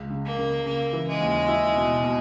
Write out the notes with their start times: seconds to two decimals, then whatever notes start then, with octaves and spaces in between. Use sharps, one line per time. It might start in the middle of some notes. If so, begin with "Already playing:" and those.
Already playing: C#2
0.10 C#3
0.25 A#3
0.38 C#3
0.66 C#3 A#3
0.93 E3
1.07 G#3
1.21 D#2
1.48 E4
1.76 B2
2.04 B2